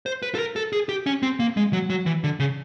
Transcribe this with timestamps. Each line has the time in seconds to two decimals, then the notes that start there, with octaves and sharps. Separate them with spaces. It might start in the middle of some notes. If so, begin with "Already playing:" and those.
0.06 C5
0.23 B4
0.35 A4
0.39 A#4
0.56 A4
0.73 G#4
0.89 G4
1.06 C#4
1.23 C4
1.40 A#3
1.57 G#3
1.73 F#3
1.90 F#3
2.06 E3
2.24 D3
2.40 C#3